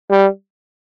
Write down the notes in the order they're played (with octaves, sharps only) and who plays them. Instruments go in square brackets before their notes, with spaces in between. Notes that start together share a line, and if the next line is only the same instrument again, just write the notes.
[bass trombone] G3